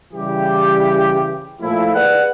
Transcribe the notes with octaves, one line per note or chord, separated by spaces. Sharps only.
C#3 E3 G3 E4 G4
A#2 F3 A3 E4
G#4 B4 D5 F#5